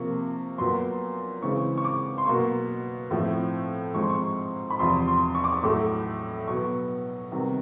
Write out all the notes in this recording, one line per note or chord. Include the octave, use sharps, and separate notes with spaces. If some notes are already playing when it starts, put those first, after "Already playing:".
Already playing: C3 F3 A#3 C#6
A#2 F#3 B3 C6
C#3 E3 G#3 C4 C#6
C#6
D6
C6
B2 F#3 A#3 C#6
A2 F3 A3 C4
G#2 F3 G#3 C4 C#6
C6
C#6
B5
E2 C3 F3 C6
C6
C#6
D6
C#6
A2 F#3 A3 D6
B2 F#3 B3 C#6
C3 D#3 G3 B3